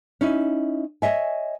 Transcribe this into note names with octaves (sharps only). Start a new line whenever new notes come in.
C#4 D#4 E4
C#5 D#5 E5 G#5